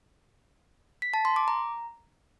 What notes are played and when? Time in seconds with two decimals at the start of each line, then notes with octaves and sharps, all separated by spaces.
1.02 B6
1.14 A5
1.25 C6
1.36 D6
1.48 A#5